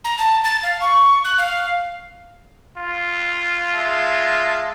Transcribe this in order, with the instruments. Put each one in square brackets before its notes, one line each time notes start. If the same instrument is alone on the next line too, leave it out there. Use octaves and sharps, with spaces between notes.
[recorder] A#5
A5
A6
F5
C#6
F#6
F5
[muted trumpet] F4
[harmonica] G#3 E5 A5